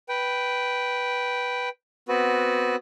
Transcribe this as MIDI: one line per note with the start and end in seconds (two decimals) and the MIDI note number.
0.09 1.69 71
0.09 1.69 79
2.08 2.76 59
2.08 2.76 60
2.08 2.76 66
2.08 2.76 71